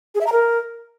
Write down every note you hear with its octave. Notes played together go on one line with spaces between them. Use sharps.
G#4
E5
A#5
A#4